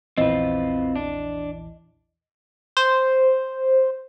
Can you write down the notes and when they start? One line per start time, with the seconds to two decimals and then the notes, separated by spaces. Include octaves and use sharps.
0.18 A#1 E2 E3 C4 F4 B4 D#5
0.96 D4
2.77 C5